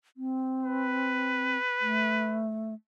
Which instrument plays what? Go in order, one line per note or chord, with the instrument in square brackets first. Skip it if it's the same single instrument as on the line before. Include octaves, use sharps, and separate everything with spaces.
[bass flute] C4
[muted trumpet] B4
[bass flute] A3